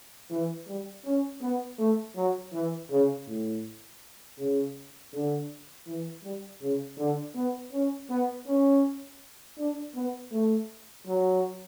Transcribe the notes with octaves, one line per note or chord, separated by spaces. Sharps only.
E3
G3
C#4
B3
A3
F#3
E3
C#3
A2
C#3
D3
E3
G3
C#3
D3
B3
C#4
B3
C#4
D4
B3
A3
F#3